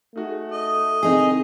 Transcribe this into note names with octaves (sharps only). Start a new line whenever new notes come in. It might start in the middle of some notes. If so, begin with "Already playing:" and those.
A3 D#4 F#4 G#4
D#5
C3 D#3 C4 D#4 G#4